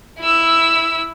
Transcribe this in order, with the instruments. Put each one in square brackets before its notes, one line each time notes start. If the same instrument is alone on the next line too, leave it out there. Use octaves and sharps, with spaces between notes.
[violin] E4 E6